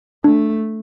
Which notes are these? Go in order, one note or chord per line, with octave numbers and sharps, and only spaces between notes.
A3 D4